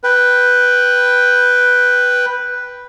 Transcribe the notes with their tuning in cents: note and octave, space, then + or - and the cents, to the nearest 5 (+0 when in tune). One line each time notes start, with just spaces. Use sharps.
B4 +0 G5 +0